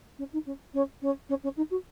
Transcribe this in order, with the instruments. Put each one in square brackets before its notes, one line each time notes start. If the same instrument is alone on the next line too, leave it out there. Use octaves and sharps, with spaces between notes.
[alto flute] C#4
D#4
C#4
C#4
C#4
C#4
C#4
D#4
F#4